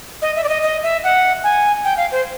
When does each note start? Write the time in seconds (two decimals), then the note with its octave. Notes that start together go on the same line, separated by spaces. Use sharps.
0.22 D#5
0.36 E5
0.44 D5
0.49 D#5
0.63 D#5
0.83 E5
1.04 F#5
1.44 G#5
1.85 G5
1.97 F5
2.12 C5